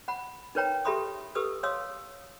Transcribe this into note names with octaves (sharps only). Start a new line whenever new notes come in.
F#5 B5
D#4 A#4 B4 C#5 G5 A#5
G4 A4 E5 B5 C6 D#6
G4 A4 B4 D#6 E6
C#5 F5 C6 D#6 E6